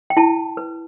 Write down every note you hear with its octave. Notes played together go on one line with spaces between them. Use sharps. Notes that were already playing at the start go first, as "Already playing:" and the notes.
G5
E4 A5
B4